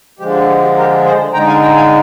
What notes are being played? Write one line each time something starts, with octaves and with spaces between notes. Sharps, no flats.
D3 F3 G#3 G4
G4
G4
G4
G4 A#4
G#4 C5
D3 G#3 D#4 G5 A#5
F5 G#5
G5 A#5
F5 G#5